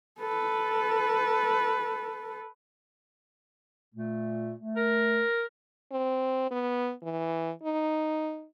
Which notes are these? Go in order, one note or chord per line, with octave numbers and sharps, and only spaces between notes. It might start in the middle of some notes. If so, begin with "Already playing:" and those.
A4 B4
A#2 A3
A3
A#4
C4
B3
E3
D#4